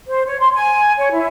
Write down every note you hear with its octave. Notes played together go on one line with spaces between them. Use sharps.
C5
C#5
C6
G#5
C#5
E4